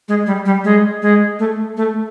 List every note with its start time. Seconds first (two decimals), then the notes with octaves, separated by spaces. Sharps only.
0.08 G#3
0.26 G3
0.45 G3
0.64 G#3
1.02 G#3
1.39 A3
1.77 A3